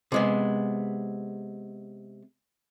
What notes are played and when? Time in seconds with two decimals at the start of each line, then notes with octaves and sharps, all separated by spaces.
0.12 C3 G#3 B3